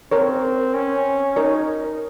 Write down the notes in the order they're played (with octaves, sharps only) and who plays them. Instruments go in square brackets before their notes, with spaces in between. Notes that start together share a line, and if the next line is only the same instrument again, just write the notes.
[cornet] C4 [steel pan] A#4 C#5
[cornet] C#4
[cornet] D#4 [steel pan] A#4 C#5